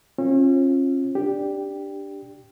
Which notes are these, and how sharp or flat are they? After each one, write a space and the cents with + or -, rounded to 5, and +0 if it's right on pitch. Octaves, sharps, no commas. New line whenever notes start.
C#4 -40 F4 +0
D4 +0 G4 +0